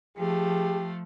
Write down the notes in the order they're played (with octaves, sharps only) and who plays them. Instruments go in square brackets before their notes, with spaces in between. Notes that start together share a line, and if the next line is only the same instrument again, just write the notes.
[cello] F3 A3 [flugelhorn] G4 [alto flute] G#4